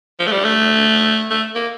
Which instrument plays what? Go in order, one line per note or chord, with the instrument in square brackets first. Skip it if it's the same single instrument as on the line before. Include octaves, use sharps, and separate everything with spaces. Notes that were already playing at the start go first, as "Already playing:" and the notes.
[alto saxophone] F3
A3
G3
A3
A3
A#3